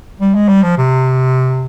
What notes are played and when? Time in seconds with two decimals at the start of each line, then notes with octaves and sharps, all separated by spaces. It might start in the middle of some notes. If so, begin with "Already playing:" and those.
0.20 G3
0.35 G#3
0.49 G3
0.63 F3
0.78 C3